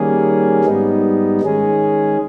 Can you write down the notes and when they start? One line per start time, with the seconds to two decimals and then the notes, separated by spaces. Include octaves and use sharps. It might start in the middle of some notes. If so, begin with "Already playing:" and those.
Already playing: D#3 G3 A#3 C#4 G#4
0.65 G#2 G3 B3 D#4
1.41 D#3 G#3 C#4 G#4